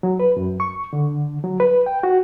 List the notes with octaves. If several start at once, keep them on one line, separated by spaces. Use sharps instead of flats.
F#3
B4
F#2
C#6
D3
F#3
B4
G5
F#4